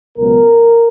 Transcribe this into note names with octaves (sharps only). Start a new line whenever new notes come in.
C#2 B2 F#3 B3 A#4